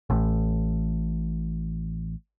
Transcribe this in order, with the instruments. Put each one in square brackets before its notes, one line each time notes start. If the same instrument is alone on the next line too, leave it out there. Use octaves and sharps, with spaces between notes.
[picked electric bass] A1 A2